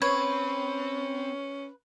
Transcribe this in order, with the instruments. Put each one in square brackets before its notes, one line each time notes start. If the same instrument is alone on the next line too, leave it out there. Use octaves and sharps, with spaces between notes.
[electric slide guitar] C4 [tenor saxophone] C#4 [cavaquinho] B4 [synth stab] C#5